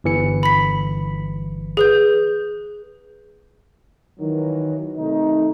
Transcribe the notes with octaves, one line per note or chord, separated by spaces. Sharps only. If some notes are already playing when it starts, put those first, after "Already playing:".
G1 E3 C#7
B5 B6
G#4 B4 G6
D#3 E3 F#3
C3 D#3 A3 D#4